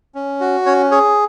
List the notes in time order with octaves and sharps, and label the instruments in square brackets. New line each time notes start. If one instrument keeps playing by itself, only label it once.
[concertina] C#4
F#4
C#4 C#5
G#4 C#5